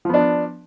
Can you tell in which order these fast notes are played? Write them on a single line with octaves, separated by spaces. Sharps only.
F3 B3 D4